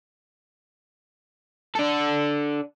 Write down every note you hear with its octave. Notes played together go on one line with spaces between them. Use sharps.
D4 A4